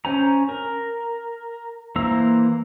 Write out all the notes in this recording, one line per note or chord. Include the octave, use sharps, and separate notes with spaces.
C#4 C5 G#5 A#5
A#4
E3 A#3 C5 A#5 E6